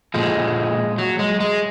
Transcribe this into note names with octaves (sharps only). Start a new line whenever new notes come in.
A#2 F3 G#3
F#3
G#3
G#3